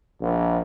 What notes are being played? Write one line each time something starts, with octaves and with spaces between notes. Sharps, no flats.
A#1